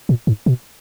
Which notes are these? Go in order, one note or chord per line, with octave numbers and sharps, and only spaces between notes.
A#2
G#2
B2